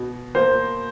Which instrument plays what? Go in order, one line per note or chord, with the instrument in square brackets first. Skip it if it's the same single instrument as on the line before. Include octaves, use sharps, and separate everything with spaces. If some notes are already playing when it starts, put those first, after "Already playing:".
Already playing: [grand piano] B2
[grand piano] A#3 [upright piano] C5